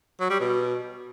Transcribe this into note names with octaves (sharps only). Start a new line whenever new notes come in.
F#3
G3
B2